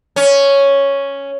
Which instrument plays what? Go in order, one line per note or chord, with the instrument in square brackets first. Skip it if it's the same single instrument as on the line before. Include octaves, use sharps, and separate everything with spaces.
[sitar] C#4